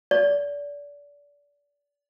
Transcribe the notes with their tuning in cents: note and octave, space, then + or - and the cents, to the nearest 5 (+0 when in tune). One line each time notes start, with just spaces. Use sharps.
D5 -30